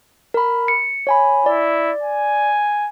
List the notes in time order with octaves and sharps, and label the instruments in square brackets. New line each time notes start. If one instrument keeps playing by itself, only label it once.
[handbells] A#4 B5
C#7
C#5 G#5 B5
[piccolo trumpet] E4 [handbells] D5
[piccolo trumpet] G#5